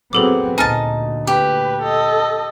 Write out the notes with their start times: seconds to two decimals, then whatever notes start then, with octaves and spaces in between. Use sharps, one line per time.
0.13 F#3 B3 C4 G#4 A4 D6
0.58 D2 A#2 D#4 G#5 A5 F6 A6
1.27 G4 B4
1.82 A4 D#5